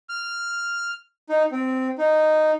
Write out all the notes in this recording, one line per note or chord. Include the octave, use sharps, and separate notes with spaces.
F6
D#4
C4
D#4